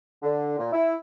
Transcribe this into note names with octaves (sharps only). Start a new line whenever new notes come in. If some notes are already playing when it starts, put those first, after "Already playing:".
D3
A#2
E4